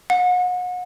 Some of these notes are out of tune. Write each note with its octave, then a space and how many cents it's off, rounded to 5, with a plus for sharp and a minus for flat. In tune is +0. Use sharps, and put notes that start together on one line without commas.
F#5 -35